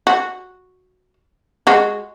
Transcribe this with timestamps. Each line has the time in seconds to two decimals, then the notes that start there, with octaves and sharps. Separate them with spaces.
0.07 F#4
1.67 G#3 F#4